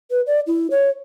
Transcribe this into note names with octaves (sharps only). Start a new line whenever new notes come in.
B4
D5
E4
C#5